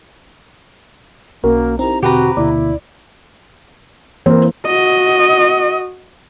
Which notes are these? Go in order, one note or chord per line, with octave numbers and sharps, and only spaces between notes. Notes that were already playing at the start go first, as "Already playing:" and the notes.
B1 A#3 C#4 F#4 A#4
C4 D#4 E4 G4 A#5
E2 B2 D3 F#4 G4 B4 A#5
D2 B2 D3 A#3 E4 D5 D6
E3 A#3 C4 A#4
F#4 D#5